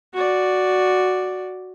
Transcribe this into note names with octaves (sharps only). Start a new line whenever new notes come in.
F#4 D5